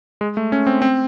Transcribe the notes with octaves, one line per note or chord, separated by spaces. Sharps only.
G#3
A3
C#4
C4
C4